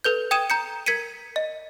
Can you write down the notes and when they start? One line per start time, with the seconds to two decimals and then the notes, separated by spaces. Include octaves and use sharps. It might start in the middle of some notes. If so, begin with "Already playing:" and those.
0.04 A4 B4 G6
0.31 G5 D#6 G#6 D#7 E7
0.50 A#5 G6 C#7
0.86 A#4 G#6 B6 C#7 D#7
1.36 D#5